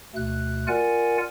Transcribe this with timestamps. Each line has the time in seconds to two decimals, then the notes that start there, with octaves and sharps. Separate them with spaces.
0.15 D2 B2 A3 F#6
0.67 F4 A#4 D5 F#5 G#5